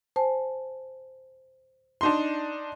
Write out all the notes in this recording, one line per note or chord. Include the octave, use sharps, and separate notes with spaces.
C5 G#5 A5
D4 D#4 C6